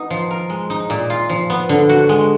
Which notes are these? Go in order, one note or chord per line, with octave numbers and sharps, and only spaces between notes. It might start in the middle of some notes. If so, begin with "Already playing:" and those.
Already playing: B3 D#4
F3
A#4
G#3
D#4
A#2
F4
F3
B3
D3
F#4
G#3